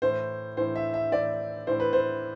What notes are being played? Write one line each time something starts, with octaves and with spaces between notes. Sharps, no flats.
A2 E3 C5
A2 E3 C5
E5
E5
A2 E3 D5
A2 E3 C5
B4
C5